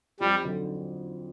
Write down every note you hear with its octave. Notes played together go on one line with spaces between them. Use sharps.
F2 G3
D3 F#3